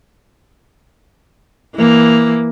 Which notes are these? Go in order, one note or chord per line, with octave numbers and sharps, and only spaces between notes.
E3 A#3